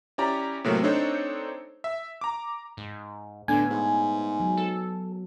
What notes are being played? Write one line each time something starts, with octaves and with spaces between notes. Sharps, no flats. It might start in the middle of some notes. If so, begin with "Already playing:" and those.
C#4 E4 G4 D5 A#5
A2 C3 F#3 A3 A#3 C4
C4 D4 D#4 A4 C5 C#5
E5
A#5 D6
G#2
A2 D3 B3 G#5
G#2
F#3
A4